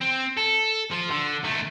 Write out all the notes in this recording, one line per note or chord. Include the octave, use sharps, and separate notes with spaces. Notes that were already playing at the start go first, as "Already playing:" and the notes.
C4
A4
F3 F4
D3
D#3 A3